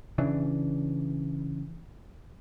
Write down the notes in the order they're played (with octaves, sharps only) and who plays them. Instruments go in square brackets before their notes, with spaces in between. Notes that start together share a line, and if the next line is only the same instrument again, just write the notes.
[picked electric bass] C#3 E3 D4